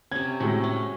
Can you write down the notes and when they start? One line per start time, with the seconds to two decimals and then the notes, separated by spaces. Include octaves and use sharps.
0.12 C3 C#4 G#6
0.40 A2 G#3 F#4
0.64 C#4